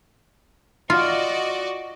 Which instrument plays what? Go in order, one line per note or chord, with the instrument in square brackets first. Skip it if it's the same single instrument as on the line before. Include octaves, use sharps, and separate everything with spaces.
[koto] F4 [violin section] F#4 D5 D#5